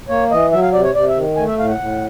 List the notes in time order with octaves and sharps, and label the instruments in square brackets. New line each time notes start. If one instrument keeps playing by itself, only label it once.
[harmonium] A#3 C#5
E3 D#5
F#3 E5
F5
C3 D5
C#5
C3 D5
E5
D#3
A3 G#5
E5
A2 F5
F#5
A2